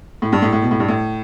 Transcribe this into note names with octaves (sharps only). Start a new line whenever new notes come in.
A2
G2
A2
A2
B2
A2
G2
A2